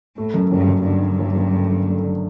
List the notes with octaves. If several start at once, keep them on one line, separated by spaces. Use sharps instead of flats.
A2 A3
F#2
F#1 G2
F#2
G2 D3
D3
F#1
F#1
A3
D3
A3
D3